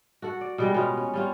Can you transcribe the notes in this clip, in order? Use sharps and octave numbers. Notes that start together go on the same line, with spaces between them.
F#4 A4 F#5
D5
B2 G3 G#3
B2 B3 C#4 F4
C#4
G3 C#4 F4